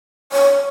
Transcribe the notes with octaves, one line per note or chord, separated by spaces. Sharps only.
C#5